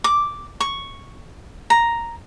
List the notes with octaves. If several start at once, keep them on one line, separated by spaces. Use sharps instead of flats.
D6
C#6
A#5